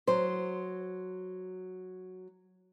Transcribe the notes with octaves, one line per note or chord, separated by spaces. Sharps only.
F#3 C5